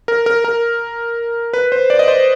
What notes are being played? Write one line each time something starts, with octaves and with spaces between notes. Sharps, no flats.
A#4
A#4
A#4
B4
C5
D5
D#5
C5